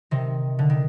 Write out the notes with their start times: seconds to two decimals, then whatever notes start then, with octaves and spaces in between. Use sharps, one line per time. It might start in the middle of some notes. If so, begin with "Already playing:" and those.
0.11 C3 D#3
0.59 D3
0.70 D#3